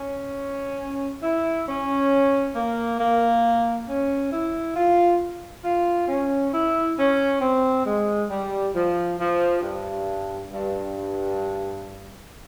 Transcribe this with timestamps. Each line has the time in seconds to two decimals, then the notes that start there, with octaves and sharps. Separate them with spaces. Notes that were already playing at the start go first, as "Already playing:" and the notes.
Already playing: C#4
1.23 E4
1.67 C#4
2.55 A#3
2.99 A#3
3.88 C#4
4.32 E4
4.76 F4
5.64 F4
6.08 C#4
6.53 E4
6.97 C#4
7.41 C4
7.84 G#3
8.30 G3
8.74 F3
9.18 F3
9.62 G2
10.49 G2